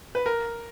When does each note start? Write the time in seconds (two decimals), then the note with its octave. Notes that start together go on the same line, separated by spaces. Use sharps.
0.15 B4
0.26 A#4